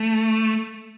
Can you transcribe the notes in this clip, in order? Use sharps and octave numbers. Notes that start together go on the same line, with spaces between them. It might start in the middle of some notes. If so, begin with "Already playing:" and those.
Already playing: A3